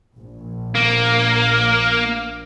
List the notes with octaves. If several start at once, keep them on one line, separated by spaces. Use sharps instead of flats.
A#1
A#3